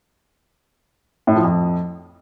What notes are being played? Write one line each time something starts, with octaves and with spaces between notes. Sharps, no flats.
A2
F3
F2